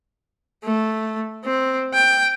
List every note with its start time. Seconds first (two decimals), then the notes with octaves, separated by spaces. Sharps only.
0.64 A3
1.45 C4
1.94 G5